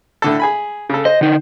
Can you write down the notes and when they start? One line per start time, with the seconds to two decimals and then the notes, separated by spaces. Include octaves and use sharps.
0.22 A2 D3 A4
0.40 G#4 G#5 B5
0.89 C#3 A4
1.05 C5 D#5
1.21 D3 D#4